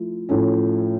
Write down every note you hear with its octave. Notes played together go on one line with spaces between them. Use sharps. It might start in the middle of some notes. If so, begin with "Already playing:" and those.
Already playing: F3 A3 E4
A2 F3 A3 C#4